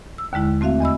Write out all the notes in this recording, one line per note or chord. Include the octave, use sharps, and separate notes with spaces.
E6
D#2 D3 G#3 E4
A3 C4 F#4 E5 F5
E2 D#5 B5 E6